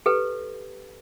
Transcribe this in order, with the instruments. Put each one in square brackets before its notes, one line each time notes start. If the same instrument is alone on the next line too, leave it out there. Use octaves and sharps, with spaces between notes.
[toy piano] G4 A4 B4